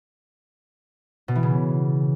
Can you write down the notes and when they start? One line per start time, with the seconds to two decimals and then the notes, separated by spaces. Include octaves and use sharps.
1.28 B2
1.35 E3
1.43 C#3